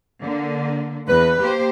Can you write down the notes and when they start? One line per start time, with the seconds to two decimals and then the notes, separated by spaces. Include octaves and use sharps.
0.22 D3 A#3
1.08 E2 B4
1.38 A#3 G4 C5